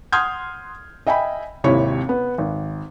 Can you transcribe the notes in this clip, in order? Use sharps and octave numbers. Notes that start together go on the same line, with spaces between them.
F#5 C6 D#6 F6 G6 G#6
D#5 E5 G5 G#5 B5
G#1 D#2 C3 E4 C#5
B3
G#1